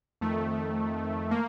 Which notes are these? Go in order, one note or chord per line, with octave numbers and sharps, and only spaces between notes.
F2 D#3 A3
A#3